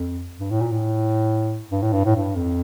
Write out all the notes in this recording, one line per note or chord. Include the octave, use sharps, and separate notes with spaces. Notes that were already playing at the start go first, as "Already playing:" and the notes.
Already playing: F2
G2
A2
A#2
A2
G2
A2
G2
A2
G2
F2